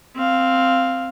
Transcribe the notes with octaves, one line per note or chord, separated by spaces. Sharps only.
C4 F5